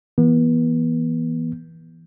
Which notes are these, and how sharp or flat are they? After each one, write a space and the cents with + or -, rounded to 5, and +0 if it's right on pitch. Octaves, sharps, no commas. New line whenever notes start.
E3 +0 B3 -40